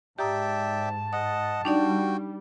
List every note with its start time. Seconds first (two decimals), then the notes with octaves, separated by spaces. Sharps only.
0.19 G#2 G4 D5 E5 G5 A5 A#5 D#6
1.13 D#5 F#5 D#6
1.65 G3 D4 D#4 F#4 D5 G5